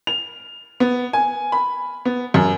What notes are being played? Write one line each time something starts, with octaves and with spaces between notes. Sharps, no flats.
F7
B3
G#5
B5
B3
F#2